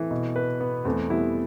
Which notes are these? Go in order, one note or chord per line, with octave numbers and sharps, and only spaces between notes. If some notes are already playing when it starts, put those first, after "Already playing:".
Already playing: E3 A3 C4
B2
B4
B3
E2 A3 C4
G3 B3 E4